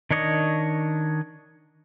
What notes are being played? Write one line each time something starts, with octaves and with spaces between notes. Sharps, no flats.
D#3 D4 C#5 D#5 C#6